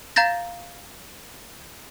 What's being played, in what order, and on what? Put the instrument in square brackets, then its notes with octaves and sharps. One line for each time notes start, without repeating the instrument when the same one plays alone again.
[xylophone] F5 A#5 G6 A6 A#6